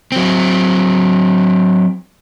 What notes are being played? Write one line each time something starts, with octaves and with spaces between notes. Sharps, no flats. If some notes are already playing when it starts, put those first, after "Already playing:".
F#3 C4